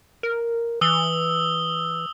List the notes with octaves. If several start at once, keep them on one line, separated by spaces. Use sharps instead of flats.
A#4
E3 D#6 E6 G7